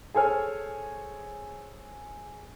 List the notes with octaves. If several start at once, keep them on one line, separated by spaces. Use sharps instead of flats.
G#4 A4 C5 C#5 G#5 F6